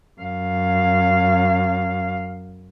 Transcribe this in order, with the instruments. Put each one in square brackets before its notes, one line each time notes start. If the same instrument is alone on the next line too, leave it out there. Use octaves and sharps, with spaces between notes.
[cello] F#2 F5